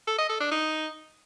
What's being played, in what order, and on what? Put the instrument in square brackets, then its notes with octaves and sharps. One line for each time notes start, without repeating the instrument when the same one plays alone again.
[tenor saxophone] A4
D#5
A4
D4
D#4